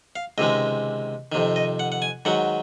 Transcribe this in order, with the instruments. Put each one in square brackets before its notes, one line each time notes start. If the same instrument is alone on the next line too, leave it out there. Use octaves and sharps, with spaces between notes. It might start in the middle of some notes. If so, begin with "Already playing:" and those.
[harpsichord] F5
C#2 C3 D#3 G#3 D#5
F2 C3 D#3
D#5
F#5
F#5
G#5
G#2 D#3 F#3 F#5